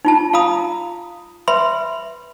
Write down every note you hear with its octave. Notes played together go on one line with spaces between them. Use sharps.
D#4 F4 A5
F4 F5 A#5 B5 D#6
B4 E5 B5 C6